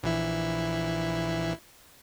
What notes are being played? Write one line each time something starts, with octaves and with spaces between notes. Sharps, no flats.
A#1 E3 E4